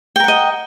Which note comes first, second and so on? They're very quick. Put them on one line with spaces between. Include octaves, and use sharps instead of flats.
G5 A#4 F#5 D#5